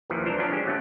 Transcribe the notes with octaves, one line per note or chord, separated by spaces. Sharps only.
A#1 D#2 A#2 E3 F3
C2 E3 D4 C5 A#5
F3 F#3 C#4 D4
D3 G#3 C#4 G4
D3 F#3 A3 B3 C#4